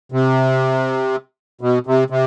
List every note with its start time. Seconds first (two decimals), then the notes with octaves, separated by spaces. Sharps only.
0.12 C3
1.61 B2
1.87 C3
2.10 C3